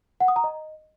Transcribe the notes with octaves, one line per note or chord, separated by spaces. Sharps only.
F#5
D#6
A#5
D#5